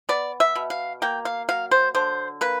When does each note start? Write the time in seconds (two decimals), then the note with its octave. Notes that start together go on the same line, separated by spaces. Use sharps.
0.09 B3 D5
0.40 E5
0.55 B2
0.70 F5
1.02 A#3 G5
1.25 F5
1.49 F#3 F5
1.71 C5
1.95 D3 C5
2.41 A#3 B4